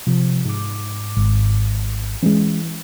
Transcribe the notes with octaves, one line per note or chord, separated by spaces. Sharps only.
C3 F3
G#2 D6
G#1
E3 G#3 C#4